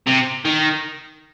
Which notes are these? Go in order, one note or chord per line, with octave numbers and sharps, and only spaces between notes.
C3
D#3